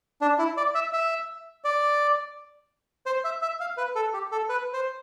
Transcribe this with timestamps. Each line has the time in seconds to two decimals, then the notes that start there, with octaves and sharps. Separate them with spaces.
0.21 D4
0.39 E4
0.57 D5
0.75 E5
0.93 E5
1.64 D5
3.06 C5
3.24 E5
3.42 E5
3.60 F5
3.77 B4
3.95 A4
4.14 G4
4.32 A4
4.49 B4
4.73 C5